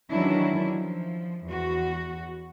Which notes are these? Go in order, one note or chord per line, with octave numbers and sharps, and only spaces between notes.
D#3 E3 F#3 C#4 D4 E4
F3
E2 F#4